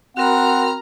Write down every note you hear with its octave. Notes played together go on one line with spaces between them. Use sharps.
C4 F#4 A#4 F#5 A#5 B5 F6